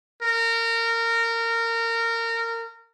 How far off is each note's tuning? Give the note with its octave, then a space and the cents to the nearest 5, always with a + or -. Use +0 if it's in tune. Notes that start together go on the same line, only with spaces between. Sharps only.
A#4 -25